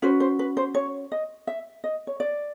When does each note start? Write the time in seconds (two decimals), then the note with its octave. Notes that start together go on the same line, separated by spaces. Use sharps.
0.02 C#4 F#4 B4 C5
0.20 C5
0.39 B4
0.57 C5
0.75 C#5
1.12 D#5
1.47 E5
1.84 D#5
2.07 C#5
2.20 D5